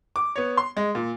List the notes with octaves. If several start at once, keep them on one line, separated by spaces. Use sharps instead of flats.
D6
B3 C#5
C6
G#3
A#2